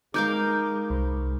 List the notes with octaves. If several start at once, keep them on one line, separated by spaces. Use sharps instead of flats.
G#3 D#4 A#4 F5 D6 G6
C2